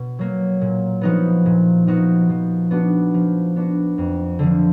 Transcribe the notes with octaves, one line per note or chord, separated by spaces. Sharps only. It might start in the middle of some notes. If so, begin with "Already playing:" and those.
Already playing: B2
F#3 A#3
A#2
F3 B3 D#4 F#4
A#2
F3 B3 D#4 F#4
F3
B3 D4 F#4
F3
B3 D4 F#4
F2
D3 F3